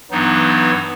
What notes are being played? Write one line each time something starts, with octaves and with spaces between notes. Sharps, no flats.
G2 E3 F#3 B3 D#4